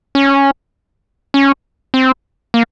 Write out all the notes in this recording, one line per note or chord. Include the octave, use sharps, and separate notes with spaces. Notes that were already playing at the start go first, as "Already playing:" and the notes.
C#4
C#4
C4
A#3